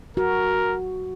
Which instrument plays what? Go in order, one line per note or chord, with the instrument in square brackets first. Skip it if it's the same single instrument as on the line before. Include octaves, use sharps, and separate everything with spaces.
[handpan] F#4 [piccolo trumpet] A#4